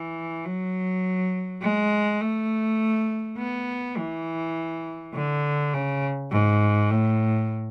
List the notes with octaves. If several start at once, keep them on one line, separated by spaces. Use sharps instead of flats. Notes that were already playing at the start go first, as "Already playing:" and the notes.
Already playing: E3
F#3
G#3
A3
B3
E3
D3
C#3
G#2
A2